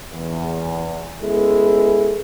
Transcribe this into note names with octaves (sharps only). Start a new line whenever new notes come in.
E2
G#3 B3 C#4 E4 G#4 A4